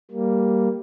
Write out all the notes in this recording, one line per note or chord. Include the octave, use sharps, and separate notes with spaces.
G3 A#3